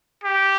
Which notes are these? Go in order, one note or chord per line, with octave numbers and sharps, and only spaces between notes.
G4